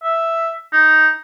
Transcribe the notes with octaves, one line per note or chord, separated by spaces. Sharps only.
E5
D#4